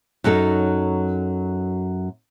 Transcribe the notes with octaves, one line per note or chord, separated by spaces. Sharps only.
F#2 F#3 D#4 A4